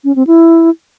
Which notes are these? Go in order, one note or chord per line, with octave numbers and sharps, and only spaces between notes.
C#4
C4
E4